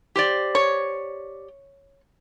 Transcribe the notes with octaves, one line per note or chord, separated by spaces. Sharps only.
G4 C5 D5
C#5